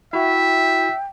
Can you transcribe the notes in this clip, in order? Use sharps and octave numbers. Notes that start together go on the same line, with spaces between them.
E4 F#4 E5 G5